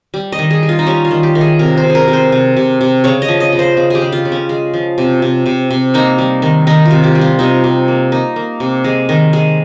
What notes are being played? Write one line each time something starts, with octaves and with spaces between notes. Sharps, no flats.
G3
D#5
D#3
G#4
G3
F4
D#4
G3 C#4
F4
D#3
G4
D#3
G#4
C3 A#4
C5
C3
G#4
A#4
C3
C5
C3
C3
C3
C#3 C#5
D#5
F3
D#5
C#3
C5
C#3
G4 G#4
C#3
F4
C#3
C#4
G#3
F3
C3
C3
C3
C3
A#3 D#4
G3
D#3
D#3 D#4
F4
C3
G4
G3
F4
C3 D#4
C3
A#3
A#3 D#4
A#3
C3
G#3
D#3
G#3